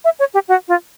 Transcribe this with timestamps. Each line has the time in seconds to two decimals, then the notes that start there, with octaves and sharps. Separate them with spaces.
0.04 E5
0.19 C#5
0.34 G4
0.48 F#4
0.68 F4